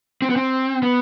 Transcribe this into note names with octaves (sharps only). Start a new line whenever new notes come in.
C4
B3
C4
B3